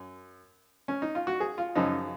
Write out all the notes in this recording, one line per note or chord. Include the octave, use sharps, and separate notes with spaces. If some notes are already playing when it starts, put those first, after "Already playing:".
Already playing: F#2
C#4
D#4
F4
F#4
G#4
F4
F#2 C#3 F3 D#4